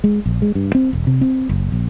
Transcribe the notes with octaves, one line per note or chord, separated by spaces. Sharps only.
G#3
A#1
G#3
G2
C4
E1
C3
C4
F#1
A#1